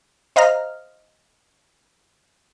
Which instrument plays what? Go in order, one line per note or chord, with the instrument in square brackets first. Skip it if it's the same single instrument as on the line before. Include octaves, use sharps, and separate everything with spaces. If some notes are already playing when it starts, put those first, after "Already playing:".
[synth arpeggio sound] C5 D#5 F5 A#5 F6